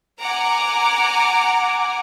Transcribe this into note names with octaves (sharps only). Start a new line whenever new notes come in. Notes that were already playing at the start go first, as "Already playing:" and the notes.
F#5 G#5 A#5 D6